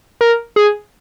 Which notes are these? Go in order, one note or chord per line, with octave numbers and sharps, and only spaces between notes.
A#4
G#4